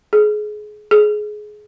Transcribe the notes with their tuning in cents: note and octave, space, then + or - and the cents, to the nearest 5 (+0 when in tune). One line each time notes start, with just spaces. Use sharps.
G#4 +25
G#4 +20